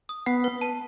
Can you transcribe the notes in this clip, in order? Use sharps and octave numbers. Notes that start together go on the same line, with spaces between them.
D#6
B3 F#5
B4
A5